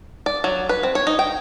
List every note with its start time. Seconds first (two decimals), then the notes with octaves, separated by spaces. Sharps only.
0.26 D5
0.44 F#3
0.69 B4
0.83 C4
0.95 C#5
1.07 D#4
1.19 G5